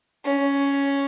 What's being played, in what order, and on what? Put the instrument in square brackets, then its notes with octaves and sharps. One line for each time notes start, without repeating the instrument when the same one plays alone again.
[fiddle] C#4